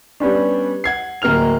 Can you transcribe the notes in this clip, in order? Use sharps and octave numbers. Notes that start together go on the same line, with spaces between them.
G3 B3 C#4 D4
F#5 G#6 C7
D1 A#3 A#4 F6 F7